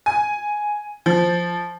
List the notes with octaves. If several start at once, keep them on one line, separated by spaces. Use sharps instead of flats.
G#5
F3